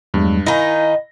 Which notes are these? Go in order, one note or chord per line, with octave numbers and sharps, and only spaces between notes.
E2 G2 F#3 G#3
D#3 D#4 E4 D#5 F5 G#5 B5 A#6